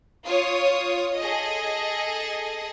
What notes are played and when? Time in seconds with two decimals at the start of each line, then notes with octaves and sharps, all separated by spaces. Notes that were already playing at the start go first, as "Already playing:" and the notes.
0.25 F4 C#5 D#6
1.18 G#4 A4 D#5